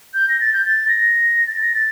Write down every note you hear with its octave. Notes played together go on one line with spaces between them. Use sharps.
G6
A#6
A6
G6
A6
A#6
A6
A#6
A6